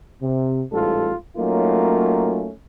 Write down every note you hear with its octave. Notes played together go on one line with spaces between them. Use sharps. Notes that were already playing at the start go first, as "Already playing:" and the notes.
C3
A1 G#2 G3 F4 A4
F#3 A3 A#3 C#4 D#4 F4